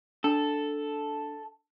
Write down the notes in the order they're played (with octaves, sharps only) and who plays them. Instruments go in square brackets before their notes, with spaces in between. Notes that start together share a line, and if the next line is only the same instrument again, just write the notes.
[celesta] D4 [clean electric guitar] A4